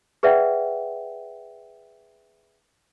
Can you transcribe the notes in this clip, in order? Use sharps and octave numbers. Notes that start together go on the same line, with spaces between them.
G#4 B4 D5 E5 F#5 G5